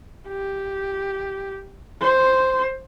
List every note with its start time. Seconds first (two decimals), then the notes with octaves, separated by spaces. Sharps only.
0.28 G4
2.02 C5